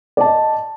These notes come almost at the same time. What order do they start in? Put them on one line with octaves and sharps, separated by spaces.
D5 A5 D#5